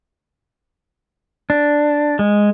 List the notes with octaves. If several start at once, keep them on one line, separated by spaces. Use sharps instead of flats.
D4
G#3